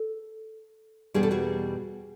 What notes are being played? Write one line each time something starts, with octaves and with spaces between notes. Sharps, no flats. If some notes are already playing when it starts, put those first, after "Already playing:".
Already playing: A4
E2 B2 G3 A#3 D4 G#4
A4
F#4 G#4